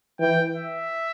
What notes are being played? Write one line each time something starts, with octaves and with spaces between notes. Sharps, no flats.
E3 G5
E5